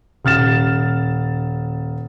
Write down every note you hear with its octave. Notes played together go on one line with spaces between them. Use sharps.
D#1 F6 A6 E7